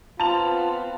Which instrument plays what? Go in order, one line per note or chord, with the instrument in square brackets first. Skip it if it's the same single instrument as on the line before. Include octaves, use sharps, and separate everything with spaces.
[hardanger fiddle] B3 C4 [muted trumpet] F4 [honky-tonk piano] A5 F7